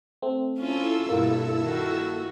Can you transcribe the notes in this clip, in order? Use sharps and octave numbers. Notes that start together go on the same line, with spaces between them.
A3 C4
C#4 E4 F4 A4 E6
G2 B2 A#3 F4
D#3 F#4